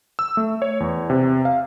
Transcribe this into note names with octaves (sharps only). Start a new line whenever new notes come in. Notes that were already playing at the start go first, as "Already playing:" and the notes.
E6
A3
C#5
E2
C3
F5